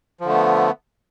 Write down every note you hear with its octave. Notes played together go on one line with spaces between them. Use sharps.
D3 F3 A3 B3